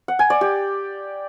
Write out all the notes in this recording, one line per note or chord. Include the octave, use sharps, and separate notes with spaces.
F#5
G#5
D5
G4